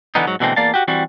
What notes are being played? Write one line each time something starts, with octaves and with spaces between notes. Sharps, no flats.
D3 E3 B3 D#4
G#2 F#3
B2 D3 E3 G#3 A3 C4
E2 A#3 D5 F5 A5
F#4 G4
E3 G3 C4 F#4